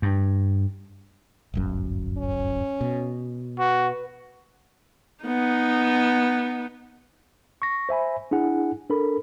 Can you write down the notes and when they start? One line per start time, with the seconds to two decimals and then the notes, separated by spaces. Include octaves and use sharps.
0.02 G2
1.54 D1 G1 F#2
2.18 C#4
2.81 B2
3.59 F#4 B4
5.24 B3 D#4
7.62 C#6 A#6
7.89 C5 E5 G#5 B5
8.31 D4 E4 G#4 F#5 G#5
8.90 D4 A4 A#4 B5